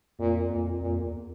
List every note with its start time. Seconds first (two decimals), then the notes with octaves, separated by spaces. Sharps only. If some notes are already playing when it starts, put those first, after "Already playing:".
0.19 F2 A#2
0.50 F2 A#2
0.81 F2 A#2
0.97 E2